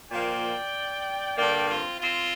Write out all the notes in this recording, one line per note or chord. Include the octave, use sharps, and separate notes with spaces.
A#2 F3 A#3 D5 G5
G2 D3 A#3 D5 G5
C4 F4
C4 F4